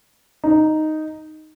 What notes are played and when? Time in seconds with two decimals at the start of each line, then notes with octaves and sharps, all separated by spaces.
0.44 D#4